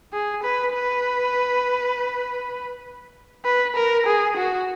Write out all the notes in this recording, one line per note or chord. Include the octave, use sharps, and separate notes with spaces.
G#4
B4
B4
B4
A#4
G#4
F#4